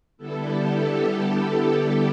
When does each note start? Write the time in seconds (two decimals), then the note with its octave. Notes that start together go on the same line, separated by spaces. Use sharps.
0.17 D3 G3 B3 E4 A4
0.48 G4
0.80 A4
1.42 G4
1.74 A4